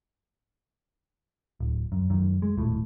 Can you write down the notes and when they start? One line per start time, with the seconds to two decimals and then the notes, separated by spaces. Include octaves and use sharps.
1.60 D1
1.92 F#2
2.10 F#2 D#3
2.42 G#3
2.57 D#1 A2